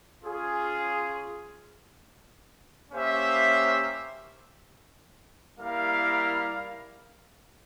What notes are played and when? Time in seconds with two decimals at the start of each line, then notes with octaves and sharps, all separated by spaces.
0.24 C#4 F4 G#4
2.92 A#3 C#4 G4 C5 E5
5.60 G3 A#3 E4 A#4 F5